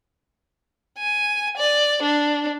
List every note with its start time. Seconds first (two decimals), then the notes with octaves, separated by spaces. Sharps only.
0.98 G#5
1.57 D5
2.03 D4